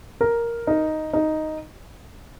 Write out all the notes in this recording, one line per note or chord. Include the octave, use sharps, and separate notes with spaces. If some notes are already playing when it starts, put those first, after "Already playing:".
A#4
D#4
D#4